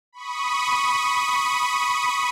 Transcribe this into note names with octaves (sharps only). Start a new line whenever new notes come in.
B5 C#6 D#6